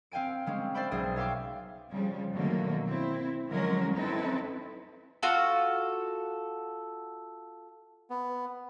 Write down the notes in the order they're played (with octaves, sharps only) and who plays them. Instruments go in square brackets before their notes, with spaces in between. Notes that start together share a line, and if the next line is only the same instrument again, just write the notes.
[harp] C4 F5 G5 G#5 D7
G3 G#3 C4 C#4
C5 D5 E5 G5 B5
B1 G#4 C5 G5 D#6 D#7
C#5 E5 F5 G5 C6 D6
[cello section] C#3 F3 G3
B2 D3 D#3 F#3 A3 A#3
C4 E4
D3 F3 F#3 G#3 C#4 A#4
C4 C#4 D#4 E4 A4 B4
[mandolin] F4 F#4 A4
[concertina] B3